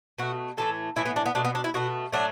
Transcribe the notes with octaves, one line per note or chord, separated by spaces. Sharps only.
B2 A3 F#4
A2 E3 A3 A4
A2 E3 A3 E4
B3
D4
B3
B2 A3 D4
B3
D4
E4
B2 A3 F#4
A2 F#3 A3 D4